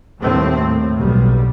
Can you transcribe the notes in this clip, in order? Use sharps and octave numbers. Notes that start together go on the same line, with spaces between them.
D#2 A2 G3 A3 C4
A2
B1 G3